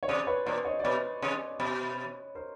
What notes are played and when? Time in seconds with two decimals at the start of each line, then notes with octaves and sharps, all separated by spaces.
0.03 C#5
0.08 C3 C5 D5
0.27 B4 C#5
0.46 A#2 C5 D5
0.65 C#5 D#5
0.79 D5
0.84 B2 B4 C#5
1.22 C3
1.60 B2
2.35 A#4 C5